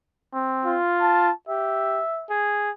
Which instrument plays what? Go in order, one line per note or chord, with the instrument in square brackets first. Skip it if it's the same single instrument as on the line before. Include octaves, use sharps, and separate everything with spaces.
[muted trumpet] C4
[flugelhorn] F4
[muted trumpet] A5
[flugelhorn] G4 [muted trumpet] E5
[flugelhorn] G#4